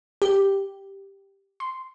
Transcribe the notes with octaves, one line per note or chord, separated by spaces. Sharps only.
G4
C6